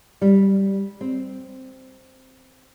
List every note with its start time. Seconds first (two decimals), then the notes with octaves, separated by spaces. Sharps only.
0.21 G3
1.01 C4